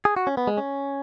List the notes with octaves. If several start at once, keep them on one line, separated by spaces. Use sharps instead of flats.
G#4
F#4
C#4
B3
G#3
C#4